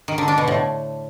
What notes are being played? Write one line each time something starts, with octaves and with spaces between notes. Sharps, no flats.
D#3
D3
D4
B2
A2